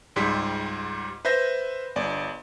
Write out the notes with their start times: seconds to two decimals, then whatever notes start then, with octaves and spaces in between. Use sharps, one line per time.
0.16 C#2 G#2 G3 C6 B6
1.25 B4 C5 E5 G6 A#6
1.96 G1 D5